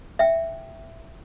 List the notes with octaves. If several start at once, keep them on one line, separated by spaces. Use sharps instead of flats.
E5 G5